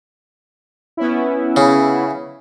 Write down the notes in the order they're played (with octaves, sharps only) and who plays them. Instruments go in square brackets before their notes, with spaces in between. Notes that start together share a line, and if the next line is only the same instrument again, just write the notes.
[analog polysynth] B3 C#4 E4
[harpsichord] C#3